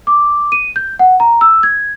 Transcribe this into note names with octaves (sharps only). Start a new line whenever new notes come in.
D6
D#7
G6
F#5
A#5
E6
G#6